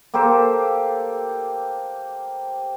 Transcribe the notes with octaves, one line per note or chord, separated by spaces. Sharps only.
A#3 G4 A4 C5